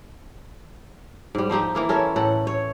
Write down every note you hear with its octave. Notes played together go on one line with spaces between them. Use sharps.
G#2 G3
F3 C4 D#4 G4
E3 A#3 E4
C#4 A4 A#4 E5
A2 A4 F#5
C#5